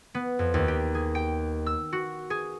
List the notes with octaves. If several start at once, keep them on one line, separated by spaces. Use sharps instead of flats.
B3
F2
D#2
G4
G#4
G5
E6
F#4
G#4